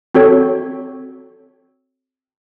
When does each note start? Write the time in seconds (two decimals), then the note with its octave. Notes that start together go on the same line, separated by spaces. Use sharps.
0.15 C4 F#4 A4 C#5